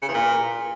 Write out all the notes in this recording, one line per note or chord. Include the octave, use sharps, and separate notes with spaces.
C#3
E2
A#2